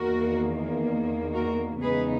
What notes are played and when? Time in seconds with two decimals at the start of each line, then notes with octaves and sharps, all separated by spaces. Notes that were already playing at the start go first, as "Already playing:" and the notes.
Already playing: E2 D#3 A#3 F#4 A#4
1.33 F#4 A#4
1.81 E2 C#3 G#3 B3 D#4 G#4 B4